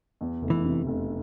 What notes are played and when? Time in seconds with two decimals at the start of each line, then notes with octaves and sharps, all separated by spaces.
0.21 E2
0.42 F1
0.50 E3
0.65 C3
0.87 F1